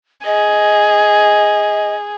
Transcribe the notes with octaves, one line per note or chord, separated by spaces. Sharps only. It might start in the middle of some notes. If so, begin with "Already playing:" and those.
G#4 D#5